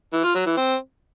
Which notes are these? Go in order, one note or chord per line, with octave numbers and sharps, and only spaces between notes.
E3
F4
F#3
E3
C4